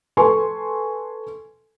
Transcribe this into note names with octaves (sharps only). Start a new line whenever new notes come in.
A4 B4 G#5 C6 C#6